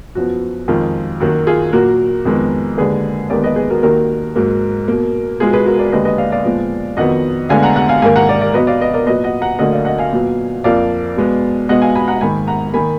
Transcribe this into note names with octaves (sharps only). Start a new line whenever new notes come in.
F#2 F3 B3 F#4
F2 D#3 G#3 F4
F#2 D#3 F#3 A#3 F#4
F4 G#4
A#2 F#3 A#3 F#4 A#4
F2 D#3 G#3 B3
D#2 D3 G#3 G#4 B4
D#2 D#3 G#3 B3 A#4 D5
B4 D#5
G#4 B4
F#4 A#4
D#2 D#3 A#3 F#4 A#4
G#2 F#3 A#3
B2 A#3
B2 G#3 B3 F4 G#4
G#4 B4
F#4 A#4
A#4 D5
D#2 D3 G#3 B4 D#5
B4 D#5
D5 F5
D5 F5
A#2 F3 G#3 B3
F2 D#3 F#3 B3 D#5 F#5
D2 D3 G#3 B3 F5 G#5
F#5 A#5
F#5 A#5
F5 G#5
G#2 D#3 A#3 F5 G#5
F#5 A#5
A#4 D5
A#4 D5
B2 F#3 B3 B4 D#5
D5 F5
B4 D#5
A#4 D5
A#2 F#3 B3 B4 D#5
D#5 F#5
F#5 A#5
D2 D3 F#3 A#3 D#5 F#5
D5 F5
D#5 F#5
F5 G#5
A#2 F#3 B3
F2 F3 A#3 D5 F5
B2 G#3 B3
B2 G#3 B3 D#5 F#5
F5 G#5
G#5 B5
F#5 A#5
G#2 D#3 A#3 G#5 B5
F#5 A#5
D#3 A#3 G#5 B5